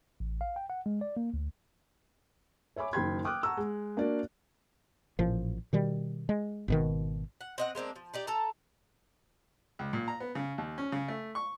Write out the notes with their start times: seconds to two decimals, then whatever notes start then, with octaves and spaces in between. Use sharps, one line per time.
0.20 A1
0.41 F5
0.56 G5
0.70 F#5
0.86 G#3
1.01 D5
1.17 A#3
1.34 D2
2.76 C#5 E5 G#5 B5 D6
2.93 F#1 D#3 G5 B5 C6 G#6
3.25 G5 D6 D#6 F6 F#6
3.43 F#5 A5 A#5 C#6 E6
3.57 G#3
3.97 A#3 D4 F#4 A#4 D5
5.19 A1 A#2 F3
5.73 B2 D#3 G3
6.29 G#3
6.68 G#1 B2 D#3
7.41 F#5
7.58 C4 D#5 F#5
7.75 G#3 A#3 C4 D4
7.96 F3
8.14 D#4 G4 D5
8.27 A4 A5 A#5
9.79 C#2
9.93 A#2
10.08 A#5
10.20 B3
10.35 C#3
10.58 D#2
10.78 C#4
10.92 C#3
11.08 A3
11.35 C#6